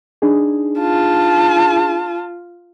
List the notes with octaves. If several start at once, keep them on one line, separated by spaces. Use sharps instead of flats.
D4 D#4 G#4
F4 A5